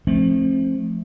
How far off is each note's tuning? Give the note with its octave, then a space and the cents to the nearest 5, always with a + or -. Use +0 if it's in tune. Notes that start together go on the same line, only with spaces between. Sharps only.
F3 +0 A3 -10 C4 +35